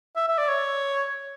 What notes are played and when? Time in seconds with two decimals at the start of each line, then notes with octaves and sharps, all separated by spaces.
0.16 E5
0.28 E5
0.38 D5
0.48 C#5